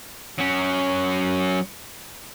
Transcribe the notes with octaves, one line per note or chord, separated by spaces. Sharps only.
F#3 C#4